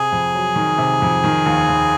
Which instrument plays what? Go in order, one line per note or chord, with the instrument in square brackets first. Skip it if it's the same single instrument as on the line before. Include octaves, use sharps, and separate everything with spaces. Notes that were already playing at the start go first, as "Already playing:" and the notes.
Already playing: [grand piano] C3 [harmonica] G#4
[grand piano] F2
F#3
D#3
C3
F2
D#3
D#2
D#2